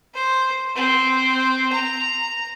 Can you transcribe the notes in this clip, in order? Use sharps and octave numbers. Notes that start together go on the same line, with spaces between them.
C5
C4
A#5